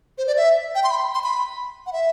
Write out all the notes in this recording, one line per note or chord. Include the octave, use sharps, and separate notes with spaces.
C5
D5
E5
G5
C6
B5
C6
B5
F#5
E5